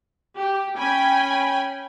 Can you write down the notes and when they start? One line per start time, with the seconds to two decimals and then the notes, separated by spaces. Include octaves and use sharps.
0.36 G4
0.78 C#4 G5 G#5 B5